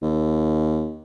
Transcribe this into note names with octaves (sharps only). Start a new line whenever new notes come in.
D#2